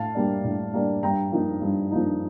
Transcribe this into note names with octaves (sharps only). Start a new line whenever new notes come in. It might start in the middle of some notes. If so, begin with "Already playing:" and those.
Already playing: A2 F5 A5
G3 A#3 D4
A2
G3 A#3 D4
G2 G5 A#5
F3 A#3 D#4
G2
F3 A#3 D#4